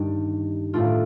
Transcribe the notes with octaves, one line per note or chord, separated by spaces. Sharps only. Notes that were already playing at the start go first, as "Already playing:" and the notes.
Already playing: G2 D#3 G3 D4
A2 A3 D4 F4